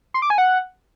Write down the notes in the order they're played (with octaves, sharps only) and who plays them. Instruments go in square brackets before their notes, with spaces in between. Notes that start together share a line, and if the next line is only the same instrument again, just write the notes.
[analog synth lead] C6
D6
G#5
F#5